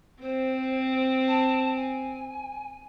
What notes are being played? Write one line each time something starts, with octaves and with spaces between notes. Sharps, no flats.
C4 C5
A5
G#5